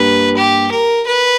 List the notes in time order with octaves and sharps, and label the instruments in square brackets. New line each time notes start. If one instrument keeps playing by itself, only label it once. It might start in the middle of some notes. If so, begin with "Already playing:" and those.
Already playing: [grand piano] G2 G3 A#3 [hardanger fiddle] B4
[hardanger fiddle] G4
A#4
B4